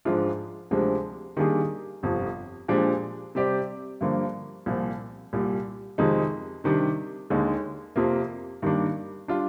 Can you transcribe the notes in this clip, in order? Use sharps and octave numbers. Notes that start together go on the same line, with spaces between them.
G#2 F3 G#3 D4 F4
D2 C3 F3 G#3 D4
D#3 G3 A#3 D4 G#4
G1 F2 C3
A#2 F3 G#3 D4 G4
C3 G3 C4 G4 D5
G2 D3 F3 A#3
C2 A#2 F3 C4
C2 A#2 G3
F2 C3 D#3 G#3 D#4
C3 D#3 G3 D4
D#2 D3 G#3 D#4
F2 C3 F3 A#3 F4
G2 D#3 G3 A#3 D4
G3 D4 F4